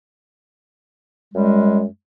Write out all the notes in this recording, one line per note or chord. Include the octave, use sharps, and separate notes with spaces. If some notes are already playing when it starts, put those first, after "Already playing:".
F#2 G3 G#3